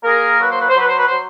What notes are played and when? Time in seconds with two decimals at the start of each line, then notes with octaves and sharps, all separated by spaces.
0.04 A#3 G#4 A#4
0.40 F#3 B4
0.50 C5
0.59 B4
0.69 C5
0.76 F#3 B4
0.88 C5
0.97 B4
1.07 F#3 C5